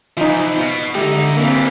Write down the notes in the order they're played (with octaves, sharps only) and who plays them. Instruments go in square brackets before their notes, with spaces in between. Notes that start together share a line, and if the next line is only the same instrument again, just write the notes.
[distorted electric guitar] E3 F3 [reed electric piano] D#4 F4
[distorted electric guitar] B2
[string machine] D3 [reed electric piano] G#3 G4 [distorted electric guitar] D#4 E4
[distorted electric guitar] E3 G3 [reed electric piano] A#3 [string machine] C4 F5